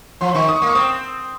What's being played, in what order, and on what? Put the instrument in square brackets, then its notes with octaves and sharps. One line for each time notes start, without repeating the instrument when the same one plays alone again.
[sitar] F3 [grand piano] C6
[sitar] D#3 [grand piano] C#6
[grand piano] D#6
C#6
[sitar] A#3 [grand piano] D#6
[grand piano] C#6
[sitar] C4 [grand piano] D#6